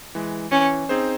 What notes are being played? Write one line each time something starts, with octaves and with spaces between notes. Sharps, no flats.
E3 G#3
E3 C#4
C4 D#4 G#4 C5